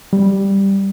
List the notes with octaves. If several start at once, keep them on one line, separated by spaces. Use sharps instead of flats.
G3